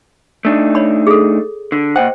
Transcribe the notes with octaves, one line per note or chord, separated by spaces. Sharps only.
A3 D4 D#4
C#5 B5
G#4 A4
D3
A#2 C5 D#5 F#5 G5